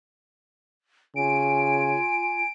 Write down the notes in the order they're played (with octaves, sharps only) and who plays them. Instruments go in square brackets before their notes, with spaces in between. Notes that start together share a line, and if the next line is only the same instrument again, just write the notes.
[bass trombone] C#3 [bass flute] F4 [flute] G#5 [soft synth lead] D7